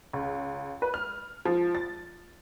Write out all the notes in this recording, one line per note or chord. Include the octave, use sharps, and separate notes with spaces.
C#2
B4
F6
F3
A6